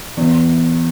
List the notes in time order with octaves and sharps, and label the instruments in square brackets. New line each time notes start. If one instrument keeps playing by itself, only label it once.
[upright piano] E2